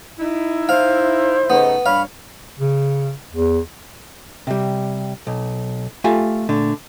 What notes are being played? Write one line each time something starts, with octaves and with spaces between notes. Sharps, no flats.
D#4 E4
C5 F5
C#3 A3 B3 D#4
G2 C#5 F5 B5
C#3
E2
C3 G3
B1
A3 F4 G4 G#5
A#2 D3 A3